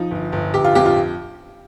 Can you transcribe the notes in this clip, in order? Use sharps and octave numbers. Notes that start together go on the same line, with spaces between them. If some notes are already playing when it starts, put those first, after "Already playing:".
Already playing: F3 D#4
G1
G1
G1 G4
F4
F2 G4
F4